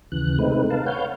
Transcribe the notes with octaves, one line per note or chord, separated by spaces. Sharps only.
D#2 C#3 E3 F#6
C3 G#3 A3 C4 D#4 B4
A#4 B4 F5 A5
B4 C#5 F5 F#5 F6 G6